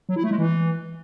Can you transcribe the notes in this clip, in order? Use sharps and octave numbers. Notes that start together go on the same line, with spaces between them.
F#3
E4
A3
G#3
E3